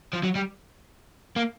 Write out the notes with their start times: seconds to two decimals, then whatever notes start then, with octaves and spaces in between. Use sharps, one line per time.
0.13 F3
0.23 F#3
0.35 G3
1.36 A#3